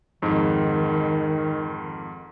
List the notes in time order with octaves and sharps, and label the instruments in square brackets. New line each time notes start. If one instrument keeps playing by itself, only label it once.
[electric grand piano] F2 G#2 [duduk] D#3